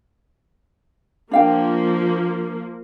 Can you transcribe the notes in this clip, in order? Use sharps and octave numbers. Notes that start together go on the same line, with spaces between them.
F3 A#3 D4 F5 G5